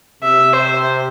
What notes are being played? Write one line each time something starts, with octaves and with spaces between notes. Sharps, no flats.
C3 E5
C5